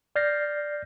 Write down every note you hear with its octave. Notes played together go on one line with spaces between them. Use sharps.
D5 F6 G6 A6 A#6 C7